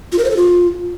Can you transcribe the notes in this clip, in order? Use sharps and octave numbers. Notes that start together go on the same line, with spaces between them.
F4
A#4
C5
A4
F4